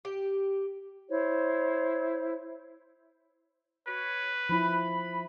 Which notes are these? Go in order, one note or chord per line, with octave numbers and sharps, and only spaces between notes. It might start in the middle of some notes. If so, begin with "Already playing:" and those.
G4
E4 C5 C#5
F#4 B4 C#5
F3 E4 B5